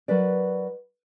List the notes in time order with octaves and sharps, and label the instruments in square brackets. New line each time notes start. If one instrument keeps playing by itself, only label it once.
[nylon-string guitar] F#3 A#4 B4 D5